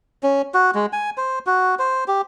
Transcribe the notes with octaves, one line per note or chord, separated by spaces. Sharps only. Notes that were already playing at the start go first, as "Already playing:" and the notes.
C#4
F#4
G#3
G#5
C5
F#4
C5
G4